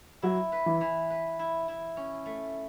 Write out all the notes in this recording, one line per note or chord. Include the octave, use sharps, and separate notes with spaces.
F#3 E4
B4
E3
E3
B4
E4
E4
C#4
A3